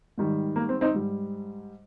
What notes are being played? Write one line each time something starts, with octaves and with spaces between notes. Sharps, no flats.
G#2 D#3 G3
A#3
C4
C4 D#4
G#2 G3